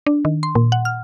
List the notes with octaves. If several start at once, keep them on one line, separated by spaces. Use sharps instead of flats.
D4
D#3
C6
A#2
F#5
F6